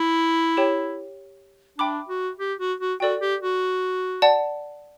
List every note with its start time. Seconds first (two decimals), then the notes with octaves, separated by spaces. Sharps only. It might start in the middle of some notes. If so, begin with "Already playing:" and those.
Already playing: E4
0.57 G4 C#5 G5
1.78 D4 E5 G5 B5 D6
2.09 F#4
2.39 G4
2.59 F#4
2.80 F#4
3.00 F#4 A4 D5 G5
3.21 G4
3.41 F#4
4.22 D5 F#5 A5